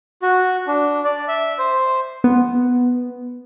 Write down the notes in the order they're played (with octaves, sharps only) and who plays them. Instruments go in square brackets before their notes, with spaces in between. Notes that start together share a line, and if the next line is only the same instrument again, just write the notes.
[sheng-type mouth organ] F#4
D4
D5
E5
C5
[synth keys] B3